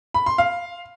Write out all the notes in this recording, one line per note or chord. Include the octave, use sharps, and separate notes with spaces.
B5
C6
F5